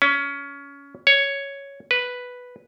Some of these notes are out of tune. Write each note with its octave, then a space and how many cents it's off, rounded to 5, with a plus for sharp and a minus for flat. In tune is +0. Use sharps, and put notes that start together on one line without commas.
C#4 +20
C#5 +5
B4 +0